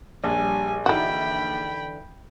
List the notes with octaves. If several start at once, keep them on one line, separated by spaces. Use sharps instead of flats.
A#1 G3 C#4 D4 G#5
D3 E3 D#4 E4 F#4 G5 B5